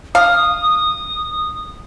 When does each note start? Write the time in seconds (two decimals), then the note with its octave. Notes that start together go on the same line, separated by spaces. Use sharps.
0.15 D4 F5 D#6